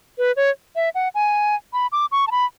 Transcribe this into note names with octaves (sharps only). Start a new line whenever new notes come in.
B4
C#5
E5
F#5
G#5
B5
D6
C#6
A5
B5